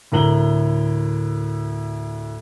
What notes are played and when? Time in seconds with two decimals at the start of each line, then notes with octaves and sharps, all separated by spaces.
0.12 D2 A2 A#4 A#5 F#7 G7